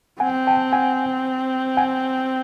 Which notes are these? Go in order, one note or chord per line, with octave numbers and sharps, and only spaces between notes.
C4 F#5 G#5
G5 A5
F#5 G#5
F#5 G#5